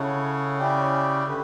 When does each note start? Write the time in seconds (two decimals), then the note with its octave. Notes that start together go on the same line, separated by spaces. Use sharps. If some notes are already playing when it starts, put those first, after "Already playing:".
Already playing: C#3 E4 A4 C#5 F#5
0.59 C#4 E4 G4 D5 G5
1.27 D3 G4 B4